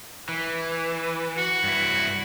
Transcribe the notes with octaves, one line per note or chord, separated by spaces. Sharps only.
E3
F#4
G2 E4